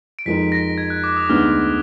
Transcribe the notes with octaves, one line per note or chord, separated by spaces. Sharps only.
D7
F2 F3 G#3 D#4 A#4 B6
A#6
G#6
F#6
D6
D#6
D2 D3 G#3 B3 D#4 F6